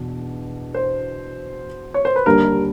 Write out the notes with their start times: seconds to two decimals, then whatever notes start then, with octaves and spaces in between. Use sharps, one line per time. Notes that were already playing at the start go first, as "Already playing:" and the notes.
Already playing: E2 B2 D4
0.74 C5
1.94 C#5
2.05 C5
2.16 B4
2.26 D#2 D3 G3 A#4